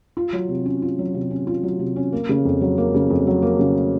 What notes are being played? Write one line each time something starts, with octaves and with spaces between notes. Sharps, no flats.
F4
F#3
C3
C#4
F4
F#3
C3
C#4
F4
F#3
C3
C#4
A#3
C#3
F2
F#3
A#3
C#3
F2
F#3
A#3
C#3